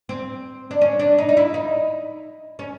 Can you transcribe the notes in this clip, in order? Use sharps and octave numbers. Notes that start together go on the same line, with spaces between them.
C4
D4
C#4
D4
D#4
D#4
E4
D#4
C#4